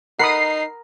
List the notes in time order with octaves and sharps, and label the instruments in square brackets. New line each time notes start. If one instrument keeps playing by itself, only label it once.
[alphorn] D#4 [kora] A#4 [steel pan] F#5 B5 D#6 [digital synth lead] C7